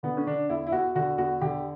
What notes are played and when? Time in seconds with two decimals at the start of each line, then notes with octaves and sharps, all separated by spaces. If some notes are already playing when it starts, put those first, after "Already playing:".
0.03 D3 B3
0.17 C#4
0.26 D3 D4
0.49 E2 E4
0.67 E4
0.72 E2 F#4
0.95 D3 F#4
1.18 E2 F#4
1.41 D3 G4